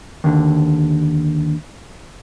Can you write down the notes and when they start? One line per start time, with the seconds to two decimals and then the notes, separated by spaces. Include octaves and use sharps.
0.24 D#2 D3